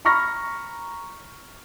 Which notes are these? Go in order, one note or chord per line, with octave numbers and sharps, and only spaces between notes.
A#5 B5 C#6 F6 A#6